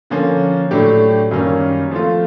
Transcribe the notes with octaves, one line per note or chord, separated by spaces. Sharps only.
D3 F3 A#3 C#4
A2 F#3 A3 D4 G4
F#2 D#3 G3 A#3 C#4
F3 A3 C4 F4